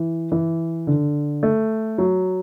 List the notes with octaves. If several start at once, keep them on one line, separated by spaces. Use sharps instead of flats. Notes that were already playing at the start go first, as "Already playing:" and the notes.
Already playing: E3
E3
D3
A3
F#3